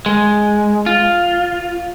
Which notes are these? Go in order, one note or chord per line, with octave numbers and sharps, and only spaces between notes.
G#3
F4